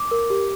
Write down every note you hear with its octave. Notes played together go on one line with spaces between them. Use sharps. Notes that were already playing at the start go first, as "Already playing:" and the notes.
Already playing: D6
A#4
G4